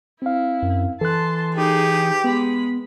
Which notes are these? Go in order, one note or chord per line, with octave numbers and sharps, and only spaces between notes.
C4 E4 F5
F#2
E3 A4 A5 C6 F#6
D#4 G4 G#4
G#3 B3 B5